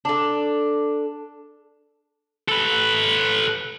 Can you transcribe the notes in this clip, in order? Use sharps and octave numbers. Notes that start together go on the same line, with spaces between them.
D4 A4
A4 B4